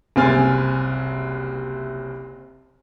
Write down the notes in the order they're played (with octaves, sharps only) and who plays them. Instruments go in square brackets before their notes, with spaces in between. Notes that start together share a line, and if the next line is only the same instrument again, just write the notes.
[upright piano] F#1 C2 C4 G#5 F6 A6